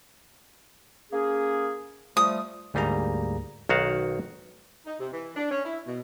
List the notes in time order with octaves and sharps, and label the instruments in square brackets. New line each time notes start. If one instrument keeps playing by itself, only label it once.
[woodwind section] A#3 C#4 G#4
[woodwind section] F3 G3 A3 [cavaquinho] D#6
[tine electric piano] D2 G#2 G3 A#3 G#4 A#5
[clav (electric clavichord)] B1 D#3 F#4 F5 F#5
[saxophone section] D#4
C3
E3
D4
C#4
E4
B2